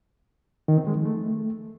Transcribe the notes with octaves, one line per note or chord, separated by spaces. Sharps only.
D#3
C4
G#3
F3
A3